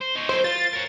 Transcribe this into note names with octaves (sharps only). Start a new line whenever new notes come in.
C5
D#4 C#5
F#3 E4 C5
F4 A6
A#4 C#5